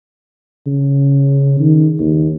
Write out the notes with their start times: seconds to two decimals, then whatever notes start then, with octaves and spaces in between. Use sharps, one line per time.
0.67 C#3
1.60 D#3
2.00 D#2